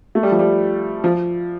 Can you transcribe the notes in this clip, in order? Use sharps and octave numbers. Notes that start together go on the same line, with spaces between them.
A3
G3
F3
G3
F3